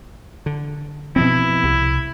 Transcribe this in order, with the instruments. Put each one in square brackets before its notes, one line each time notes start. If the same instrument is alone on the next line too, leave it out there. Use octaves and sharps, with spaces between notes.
[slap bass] D3
[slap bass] B2 F3 C4 [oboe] E4
[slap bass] C2